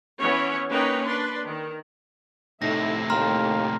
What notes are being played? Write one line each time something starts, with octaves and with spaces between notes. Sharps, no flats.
E3 B3 C#4 C#5
A#3 C#4 D#4 B4 C#5 G5
D4 B4 C6
D#3
A2 C3 D#4 E4 A4 E5 A#6
D#2 A3 F5 G5 A#5 C6 F6